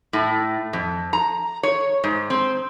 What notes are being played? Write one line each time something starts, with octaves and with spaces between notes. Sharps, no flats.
A2
F2
A#5
C#5
G#2
C4